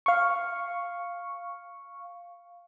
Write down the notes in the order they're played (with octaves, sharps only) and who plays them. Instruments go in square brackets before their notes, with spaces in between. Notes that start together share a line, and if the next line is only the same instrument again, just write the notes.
[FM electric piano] F5 C#6